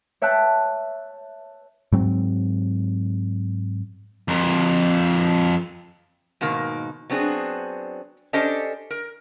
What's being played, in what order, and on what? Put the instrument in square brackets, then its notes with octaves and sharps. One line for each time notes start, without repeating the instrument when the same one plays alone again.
[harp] C#5 E5 G5 A5 F#6
[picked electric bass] G#2 F#3 C4
[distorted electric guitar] F2 A#4
[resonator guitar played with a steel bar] G#2 B2 D#3 A#3
F#3 B3 C4 D4 G#4
C#4 D4 G4 A4 C5 D#5
A#4